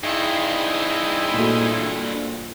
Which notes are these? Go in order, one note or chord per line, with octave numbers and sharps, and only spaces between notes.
G2 C4 D#4 E4 G#4 G5
A#2 A3 F#4